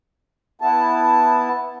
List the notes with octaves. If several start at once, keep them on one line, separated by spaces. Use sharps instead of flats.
B3 E4 A5